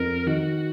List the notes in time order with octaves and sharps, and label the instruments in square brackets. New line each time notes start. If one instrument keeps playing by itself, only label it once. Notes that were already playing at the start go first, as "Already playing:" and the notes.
Already playing: [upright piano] F2 [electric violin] A#4
[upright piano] D#3 [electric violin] F#4